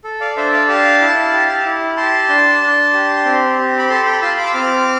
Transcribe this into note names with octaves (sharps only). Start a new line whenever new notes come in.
A4
D5 F5
D4 C5 E5
D5 F5
G4 F5 A5
E4
G4
E4
G4 A5 C6
D4
D4
G4
C4
G4
B5
A4 A5 C6
G5 B5
F4 A5 C6
B5 D6
E6
C4 D6 F6